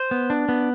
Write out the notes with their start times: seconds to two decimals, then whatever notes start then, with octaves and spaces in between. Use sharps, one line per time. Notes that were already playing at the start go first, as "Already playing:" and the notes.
Already playing: C5
0.11 B3
0.30 D4
0.49 B3